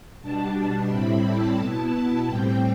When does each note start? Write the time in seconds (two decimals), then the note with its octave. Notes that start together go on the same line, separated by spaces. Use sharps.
0.22 B2 G3 D4 A5
0.56 A5
0.90 A2 G3 C4 E4 B5
1.25 A5
1.58 B2 B3 E4 A5
1.93 A5
2.26 A2 G3 C4 G5